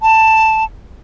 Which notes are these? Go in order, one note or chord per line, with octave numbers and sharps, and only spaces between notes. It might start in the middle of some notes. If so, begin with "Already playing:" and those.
A5